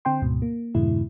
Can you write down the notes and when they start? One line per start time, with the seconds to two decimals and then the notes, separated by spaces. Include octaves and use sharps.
0.05 D3 C4 G5 C6
0.22 D2 G#2 B2
0.42 A#3
0.75 F2 G#2 B2 D3 G#3 E4